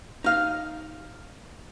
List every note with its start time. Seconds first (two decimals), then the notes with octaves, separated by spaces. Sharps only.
0.24 D#4 F5